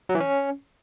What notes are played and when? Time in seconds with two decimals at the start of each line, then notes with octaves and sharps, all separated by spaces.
0.09 F#3
0.15 E3
0.20 C#4